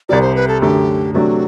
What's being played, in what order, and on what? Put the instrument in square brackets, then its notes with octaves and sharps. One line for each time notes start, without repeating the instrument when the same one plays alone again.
[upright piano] C2 C3 G3 [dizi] D5
[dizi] C5
B4
A4
[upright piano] F#2 D3 A3 [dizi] G4
[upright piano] C3 F#3 A3 D4 [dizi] F#4